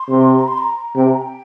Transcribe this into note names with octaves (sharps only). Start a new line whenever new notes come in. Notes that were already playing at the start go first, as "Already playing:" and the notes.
Already playing: C6
C3
A#5
C6
A#5
C3 G5
A#5
G5